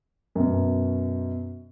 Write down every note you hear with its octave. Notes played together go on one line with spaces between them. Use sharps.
F#2 B2